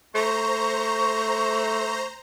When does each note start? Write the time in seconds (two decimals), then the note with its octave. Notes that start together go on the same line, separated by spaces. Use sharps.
0.15 A3 C5 A#5 C#6